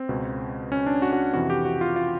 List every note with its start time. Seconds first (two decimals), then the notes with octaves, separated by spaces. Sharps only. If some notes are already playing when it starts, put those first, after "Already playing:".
Already playing: C4
0.09 C#2 B2
0.72 C#4
0.86 D4
1.02 F#4
1.13 F#4
1.33 F2 C3 E3 F#4
1.50 G4
1.65 F#4
1.81 F4
1.96 F4